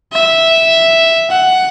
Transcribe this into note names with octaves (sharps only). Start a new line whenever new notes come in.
E5
F#5